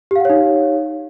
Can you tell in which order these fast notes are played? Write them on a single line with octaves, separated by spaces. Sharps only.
G4 F5 F#5 C#5 D#4